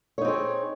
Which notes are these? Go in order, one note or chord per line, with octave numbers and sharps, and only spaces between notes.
C4 D#4 G#4 C#5